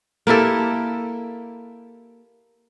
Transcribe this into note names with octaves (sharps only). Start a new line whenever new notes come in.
A#3 E4 G4 A4